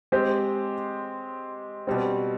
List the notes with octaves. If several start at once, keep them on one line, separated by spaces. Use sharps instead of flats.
G#3 C4 G4 C5
B2 G3 C4